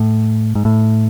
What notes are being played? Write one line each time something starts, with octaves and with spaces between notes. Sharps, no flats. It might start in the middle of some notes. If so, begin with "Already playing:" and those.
Already playing: A2
G#2
A2